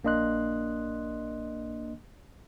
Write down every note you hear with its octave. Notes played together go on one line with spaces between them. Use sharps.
A#1 A#3 D4 D#5 C6 F#6